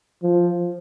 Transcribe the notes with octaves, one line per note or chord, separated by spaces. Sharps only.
F3